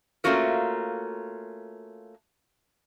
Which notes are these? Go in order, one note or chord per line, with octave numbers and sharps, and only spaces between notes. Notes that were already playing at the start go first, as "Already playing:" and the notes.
A3 A#3 C#4 F4 F#4 A#4